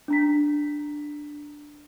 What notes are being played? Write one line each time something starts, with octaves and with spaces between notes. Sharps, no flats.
D4 A#5 B6